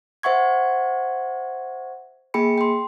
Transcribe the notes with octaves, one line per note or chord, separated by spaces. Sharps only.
C5 E5 F#5 C#6 G#6
A#3 G#4 G5 B5 C#7
G5 C6